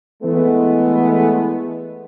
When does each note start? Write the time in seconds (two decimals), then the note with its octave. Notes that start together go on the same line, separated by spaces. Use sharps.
0.23 E3 G#3 A3 B3